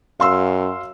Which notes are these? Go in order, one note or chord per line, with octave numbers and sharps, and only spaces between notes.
F#2 F5 C6 E6